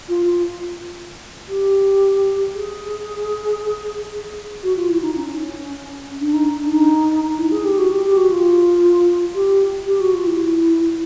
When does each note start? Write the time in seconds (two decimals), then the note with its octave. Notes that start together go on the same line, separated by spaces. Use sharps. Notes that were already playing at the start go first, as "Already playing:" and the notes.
0.09 F4
0.26 F4
1.49 G4
2.54 G#4
4.63 F#4
4.76 F4
4.90 E4
5.02 D#4
5.16 C#4
6.21 D4
6.34 D#4
6.60 D4
6.73 D#4
7.25 D#4
7.38 E4
7.52 G#4
7.65 G4
7.78 F#4
7.91 G4
8.04 G4
8.17 F#4
8.30 F4
9.35 G4
9.87 G4
10.00 F#4
10.14 F4
10.27 E4